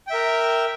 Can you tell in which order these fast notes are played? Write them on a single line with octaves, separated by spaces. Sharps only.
G5 E5 A#4